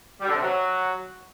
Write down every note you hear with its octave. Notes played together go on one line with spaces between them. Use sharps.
G3
D3
C3
F#3